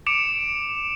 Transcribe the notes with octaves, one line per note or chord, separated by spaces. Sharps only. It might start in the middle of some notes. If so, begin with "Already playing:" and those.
D6 C#7 D7 E7 F7